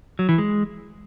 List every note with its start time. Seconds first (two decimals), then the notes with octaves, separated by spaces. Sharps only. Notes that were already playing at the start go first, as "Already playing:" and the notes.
0.19 F#3
0.29 E3
0.38 G#3